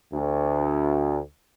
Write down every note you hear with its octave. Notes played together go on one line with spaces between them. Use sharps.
D2